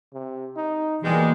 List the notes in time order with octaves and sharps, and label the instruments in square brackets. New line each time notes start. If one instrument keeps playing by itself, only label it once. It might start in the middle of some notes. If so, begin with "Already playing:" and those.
[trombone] C3
D#4
[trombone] B2 [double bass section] E3 A#3 [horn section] G3 G#3